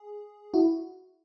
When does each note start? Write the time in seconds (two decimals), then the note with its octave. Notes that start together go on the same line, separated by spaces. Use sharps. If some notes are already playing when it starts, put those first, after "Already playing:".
Already playing: G#4
0.54 E4 F#4